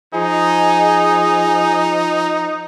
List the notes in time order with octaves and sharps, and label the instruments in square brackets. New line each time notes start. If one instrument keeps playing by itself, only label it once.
[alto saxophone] F3 [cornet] D#4 [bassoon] G#4